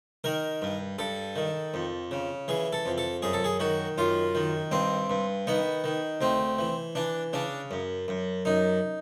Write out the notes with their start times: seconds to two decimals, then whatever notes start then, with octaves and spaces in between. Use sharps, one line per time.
0.24 D#3 A#4
0.62 G2
0.98 G2 A4
1.36 D#3
1.74 F2
2.11 C#3
2.48 E3 G#4
2.73 A4
2.86 F2
2.98 A4
3.22 F#2 G#4
3.33 A4
3.44 G#4
3.60 D#3 F#4
3.98 F#2 F4
4.35 D#3
4.71 G2 C4
5.10 G2
5.47 D#3 B3
5.84 D#3
6.21 D2 C4
6.59 E3
6.95 E3 D4
7.33 C#3 D4
7.71 F#2
8.08 F#2
8.45 F#2 D#4